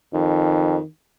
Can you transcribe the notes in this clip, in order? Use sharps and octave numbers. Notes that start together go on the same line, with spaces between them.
F2 D#3